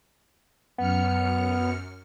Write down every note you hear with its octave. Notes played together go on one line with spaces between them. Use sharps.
F#2 B3 F6 C#7